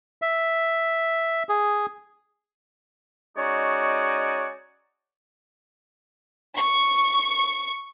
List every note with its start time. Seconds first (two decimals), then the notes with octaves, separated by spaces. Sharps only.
0.22 E5
1.49 G#4
3.36 G#3 C#4 D#4 F#4 C#5 D5
6.56 C#6